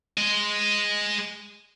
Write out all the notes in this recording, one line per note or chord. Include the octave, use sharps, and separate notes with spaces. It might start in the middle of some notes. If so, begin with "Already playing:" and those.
G#3 D#5